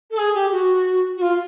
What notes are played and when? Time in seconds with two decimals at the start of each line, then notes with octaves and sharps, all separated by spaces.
0.11 A4
0.18 G#4
0.34 G4
0.51 F#4
1.17 F#4
1.22 F4